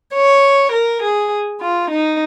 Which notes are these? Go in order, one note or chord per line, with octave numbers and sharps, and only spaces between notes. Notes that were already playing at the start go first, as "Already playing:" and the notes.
C#5
A#4
G#4
F4
D#4